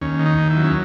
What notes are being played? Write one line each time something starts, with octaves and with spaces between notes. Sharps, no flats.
D#2 C#4
D#3
D#4
D#2
E4
F#3
C#4